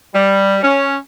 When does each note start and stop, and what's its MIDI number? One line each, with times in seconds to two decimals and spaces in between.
0.13 0.57 55
0.62 0.95 61